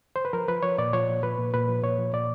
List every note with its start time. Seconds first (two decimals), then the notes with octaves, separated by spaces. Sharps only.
0.16 C5
0.25 B4
0.33 F3 A#4
0.48 F3 B4
0.63 F3 C#5
0.78 A#2 D5
0.93 F3 C#5
1.08 A#2
1.23 F3 B4
1.38 A#2
1.54 A#2 B4
1.69 F3
1.83 A#2 C#5
1.98 F3
2.14 A#2 D5